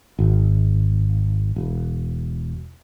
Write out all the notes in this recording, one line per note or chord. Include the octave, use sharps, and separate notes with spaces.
G#1
E1